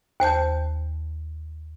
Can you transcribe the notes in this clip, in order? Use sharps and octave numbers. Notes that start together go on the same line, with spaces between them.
D#2 C5 A5 G6